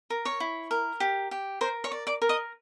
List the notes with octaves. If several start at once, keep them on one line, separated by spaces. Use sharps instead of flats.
A#4
C#5 C#6
E4
A#4
G4
G4
A#4 C5 C6
C#5 C#6
D5
D5 D6
A#4
D#5 D#6